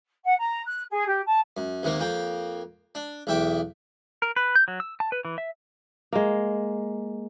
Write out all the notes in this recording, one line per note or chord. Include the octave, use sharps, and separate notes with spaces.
F#5
A#5
F#6
G#4
G4
A5
F#2
D#2 C3 D#3 A#3
F2 A#3 G5
D4
B1 E2 E5 G5 D6
A#4
B4
G6
F#3
E6
A5
B4
E3
E5
G#3 A#3